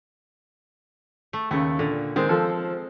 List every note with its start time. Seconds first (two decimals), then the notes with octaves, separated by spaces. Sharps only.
1.33 A3
1.51 D#2 C#3 A3
1.79 A#2 D3
2.16 D#3 G#3 C4
2.29 F3 A4